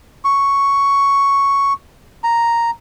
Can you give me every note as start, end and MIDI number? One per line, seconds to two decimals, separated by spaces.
0.25 1.73 85
2.24 2.70 82